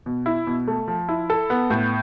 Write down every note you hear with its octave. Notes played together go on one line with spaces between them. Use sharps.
B2
E4
B2
A3
F3
E4
A4
B3
A2